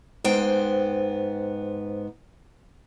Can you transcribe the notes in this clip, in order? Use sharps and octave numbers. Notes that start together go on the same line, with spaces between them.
G#2 B3 C5 G5